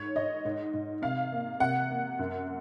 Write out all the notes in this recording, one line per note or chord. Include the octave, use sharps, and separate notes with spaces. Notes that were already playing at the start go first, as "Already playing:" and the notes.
Already playing: G#2 C#5
G#2 D#5
G#2
G#2
C3 F5
A#3
C3 F#5
A#3
F#2